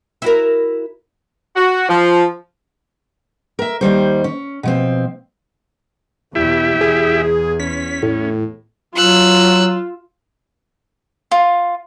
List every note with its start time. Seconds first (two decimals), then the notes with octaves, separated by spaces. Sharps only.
0.22 E4 F#4 A#4
1.56 F#4
1.89 F3
3.59 A#4 E5
3.81 D#2 D#3 G3 C5
4.24 C#4
4.63 B2 F3 C4
6.35 E2 B2 E4 G4 E5
6.81 E2 G#4
7.60 C#4 B6
8.03 A2
8.96 F#3 F4 E6 F#6
11.31 F4